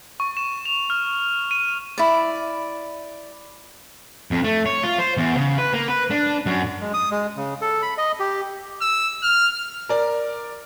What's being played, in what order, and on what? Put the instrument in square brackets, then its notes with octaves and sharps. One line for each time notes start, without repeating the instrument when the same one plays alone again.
[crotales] C#6
E7
F7
F6
D#7
[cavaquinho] E4 D5
[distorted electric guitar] F2
A3
C#5
F4
C5
E2
C#3
B4
A#3
B4
D4
F#2
[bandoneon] G#3
D#6
G#3
C#3
A4
B5
D#5
G4
[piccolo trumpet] E6
F6
[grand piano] A#4 D5